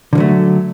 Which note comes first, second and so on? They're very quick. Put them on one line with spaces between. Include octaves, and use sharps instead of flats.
D3 F3 F#3 A3